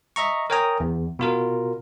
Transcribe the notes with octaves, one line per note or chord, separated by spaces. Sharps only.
D#5 E5 A#5 C#6
A#4 C#5 G5 G#5 A#5 D#6
E2
B2 F4 A#4